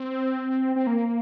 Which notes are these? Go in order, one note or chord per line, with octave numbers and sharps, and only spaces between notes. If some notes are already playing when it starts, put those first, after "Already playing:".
Already playing: C4
C4
A#3